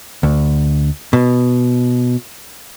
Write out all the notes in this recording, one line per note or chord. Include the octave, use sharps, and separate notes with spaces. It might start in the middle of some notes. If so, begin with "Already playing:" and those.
D2
B2